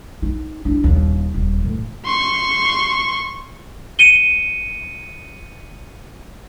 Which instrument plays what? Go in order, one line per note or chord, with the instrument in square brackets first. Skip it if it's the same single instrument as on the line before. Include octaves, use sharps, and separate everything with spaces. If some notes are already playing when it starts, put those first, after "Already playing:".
[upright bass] D#4
D4 E4
D#1 D#2
D#1
A2 E3
[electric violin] C6 C#6
[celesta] C#7 D#7 G7